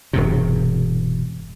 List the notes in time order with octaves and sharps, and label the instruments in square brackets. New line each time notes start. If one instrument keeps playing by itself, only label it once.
[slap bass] E1 G2 C3